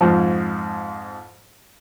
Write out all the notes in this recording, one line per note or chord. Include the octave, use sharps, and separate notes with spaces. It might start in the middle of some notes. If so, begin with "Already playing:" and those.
F2 G#2 F3